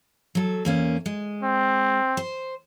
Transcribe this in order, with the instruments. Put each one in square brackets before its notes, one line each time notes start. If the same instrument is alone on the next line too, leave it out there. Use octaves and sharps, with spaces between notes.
[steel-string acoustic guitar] F#3 A4
E2 A#3 C#4
G#3
[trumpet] C4
[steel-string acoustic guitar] C5